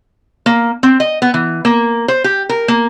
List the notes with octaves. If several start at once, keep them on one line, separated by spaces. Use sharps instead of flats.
A#3
C4
D#5
B3
E3
A#3
C5
G4
A#4
A#3